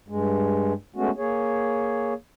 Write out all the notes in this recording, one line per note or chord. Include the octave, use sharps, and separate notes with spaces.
G2 G#3
G#3 A3 B3 C#4 F#4
A#3 G#4 C#5